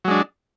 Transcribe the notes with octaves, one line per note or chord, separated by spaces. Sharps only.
F#3 G#3 D4